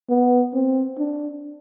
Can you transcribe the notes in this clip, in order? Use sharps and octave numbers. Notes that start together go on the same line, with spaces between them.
B3
C4
D4